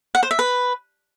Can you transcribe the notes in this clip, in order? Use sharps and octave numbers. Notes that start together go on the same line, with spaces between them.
F#5
C5
E5
B4